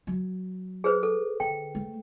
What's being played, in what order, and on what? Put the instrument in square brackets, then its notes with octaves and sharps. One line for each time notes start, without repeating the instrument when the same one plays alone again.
[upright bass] F#3
[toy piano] G#4 B4 C5
A4
[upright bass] D3 [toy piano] G5
[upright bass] A3